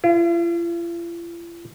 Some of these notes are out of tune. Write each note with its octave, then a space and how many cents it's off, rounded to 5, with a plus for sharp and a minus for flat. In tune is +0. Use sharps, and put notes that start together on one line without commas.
F4 -45